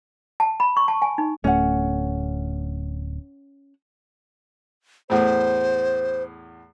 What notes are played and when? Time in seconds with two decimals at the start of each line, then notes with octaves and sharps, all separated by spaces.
0.40 A5
0.60 B5
0.77 C#6
0.88 A5
1.02 G#5
1.18 D#4
1.44 D1 A3 C#4 F#5
5.10 E2 A2 C5